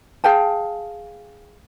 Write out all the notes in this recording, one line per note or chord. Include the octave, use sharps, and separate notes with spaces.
G#4 F5 G5 A5